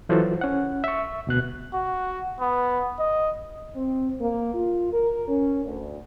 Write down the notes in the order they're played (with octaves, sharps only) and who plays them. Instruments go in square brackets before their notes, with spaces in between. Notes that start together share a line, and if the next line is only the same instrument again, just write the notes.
[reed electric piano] E3 F#3 F4 F#4 A4 C5
C#4 F#5
E5 C#6
D2 B2 F#6
[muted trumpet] F#4
B3
D#5
[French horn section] C4
A#3
F4
A#4
C#4
D2